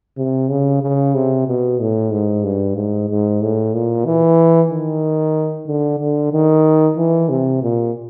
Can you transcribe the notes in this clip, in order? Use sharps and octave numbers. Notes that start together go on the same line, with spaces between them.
C3
C#3
C#3
C3
B2
A2
G#2
G2
G#2
G#2
A2
A#2
E3
D#3
D3
D3
D#3
E3
C3
A#2